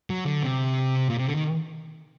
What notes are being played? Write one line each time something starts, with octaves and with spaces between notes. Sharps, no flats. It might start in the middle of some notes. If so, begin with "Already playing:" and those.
F#3
D3
C3
A#2
C3
D3
D#3